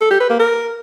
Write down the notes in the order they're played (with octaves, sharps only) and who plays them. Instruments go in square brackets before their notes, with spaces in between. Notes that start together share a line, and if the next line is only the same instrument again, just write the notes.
[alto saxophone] A4
G4
B4
A#3
A#4